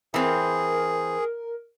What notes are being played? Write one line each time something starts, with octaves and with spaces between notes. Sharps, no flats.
E3 C4 G#4 A#4